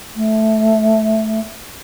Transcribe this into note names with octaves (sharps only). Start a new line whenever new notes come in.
A3